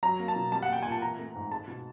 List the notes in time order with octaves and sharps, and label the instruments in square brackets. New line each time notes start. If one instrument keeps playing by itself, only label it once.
[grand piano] F#3 A#5
A#3
A5
B2
G3 A5
F#5
A#3 G5
A#2 G#5
A5
E3 A#5
A3
G#2
G#3 A5
B2